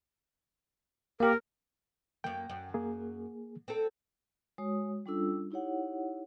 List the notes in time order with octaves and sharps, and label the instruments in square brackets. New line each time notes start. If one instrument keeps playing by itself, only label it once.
[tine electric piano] A#3 G4 [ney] A#4
[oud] F#2 A#3 [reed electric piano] G5
[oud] F#2
[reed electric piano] A#3 G#4
[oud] C4 A4
[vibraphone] G#3 F#4 C#5 D#6
G3 C#4 D4 F4 A4 E6
D#4 E4 G4 C#5 F#5